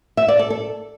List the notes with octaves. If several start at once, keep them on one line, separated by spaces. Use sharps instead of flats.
E5
D5
A4
A4